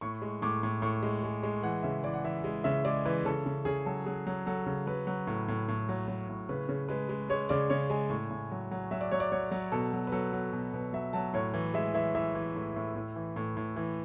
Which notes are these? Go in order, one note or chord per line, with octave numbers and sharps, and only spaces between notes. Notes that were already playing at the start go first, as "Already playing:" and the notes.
A2 C#6
G#3
A2 D6
A2
A2 C#6
G#3
G#3
G#3
E3 F#5
C#3 E5
E3 D5
F#5
E3 E5
G#3
C#3 E5
G#3 D5
E3 B4
C#3 A4
C#3
C#3 G#4
F#3 A4
F#3 G#4
F#3
F#3 A4
C#3
F#3 B4
F#3
A2
A2
A2
F#3
F#3
A2
C#3 B4
C#3
G#3 B4
G#3
G#3 C#5
C#3 D5
C#3 C#5
G#3 G#5
A2
A2
F#3
F#3
F#3 E5
D5
F#3 C#5
D5
F#3 C#5
F#3
B2 A4
F#3
B4
F#3 A4
F#3
B2
B2 B4
F#3 E5
F#3 A5
A2 C#5
E3
G#3 E5
E3 E5
E3 E5
E3
A2
A2
A2
E3
A2
A2
E3